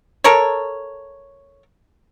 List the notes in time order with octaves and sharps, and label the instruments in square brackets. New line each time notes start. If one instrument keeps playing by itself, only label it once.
[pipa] A4 A#4 C#5